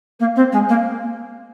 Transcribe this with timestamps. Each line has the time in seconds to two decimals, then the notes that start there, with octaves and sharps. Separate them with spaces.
0.19 A#3
0.35 C4
0.52 G#3
0.68 A#3